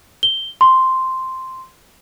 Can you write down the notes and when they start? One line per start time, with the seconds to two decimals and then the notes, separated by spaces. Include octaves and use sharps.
0.23 G7
0.61 C6